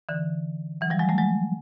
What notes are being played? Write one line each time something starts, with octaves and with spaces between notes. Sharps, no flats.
D3 E3
E3 F#3
F3 G3
F#3 G#3
G3 A3
F#3 G#3